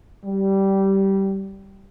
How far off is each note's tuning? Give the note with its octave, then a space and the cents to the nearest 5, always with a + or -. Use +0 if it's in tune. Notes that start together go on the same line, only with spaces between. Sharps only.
G3 -15